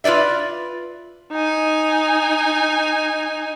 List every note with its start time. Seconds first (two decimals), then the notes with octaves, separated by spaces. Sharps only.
0.04 F4 B4 C5 D5 E5
1.32 D#4 G#5